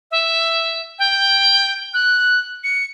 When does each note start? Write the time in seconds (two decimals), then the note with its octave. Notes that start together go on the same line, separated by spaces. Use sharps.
0.11 E5
0.99 G5
1.94 F#6
2.64 C#7